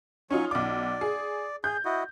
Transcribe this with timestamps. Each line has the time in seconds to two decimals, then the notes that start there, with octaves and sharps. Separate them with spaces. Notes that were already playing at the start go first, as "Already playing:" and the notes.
0.31 F#3 C#4 D#4 F4 G#5 C#6
0.51 B1 D5 D6
1.01 G#4
1.64 G#4 G6
1.85 E4 F#4 D#5